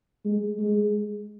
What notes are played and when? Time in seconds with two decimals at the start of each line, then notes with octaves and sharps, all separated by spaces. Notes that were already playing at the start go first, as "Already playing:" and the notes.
0.25 G#3
0.59 G#3